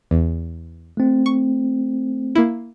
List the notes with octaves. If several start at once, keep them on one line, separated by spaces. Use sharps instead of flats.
E2
A3 C4
C#6
A#3 E4